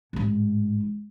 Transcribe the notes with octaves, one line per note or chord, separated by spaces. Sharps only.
A1 G#2